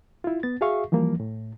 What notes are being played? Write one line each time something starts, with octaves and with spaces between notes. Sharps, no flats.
E4 F4
B3 A6
F#4 G#4 E5 F5 C#6
E3 F3 G3 A#3
A2